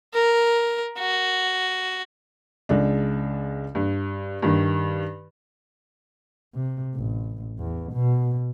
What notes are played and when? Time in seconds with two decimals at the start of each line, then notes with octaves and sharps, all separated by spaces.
0.14 A#4
0.99 F#4
2.69 C#2 G#3 D4
3.75 G2
4.43 G2 D#3
6.55 C3
6.95 A1
7.59 E2
7.93 B2